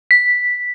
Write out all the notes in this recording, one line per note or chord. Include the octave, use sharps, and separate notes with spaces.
B6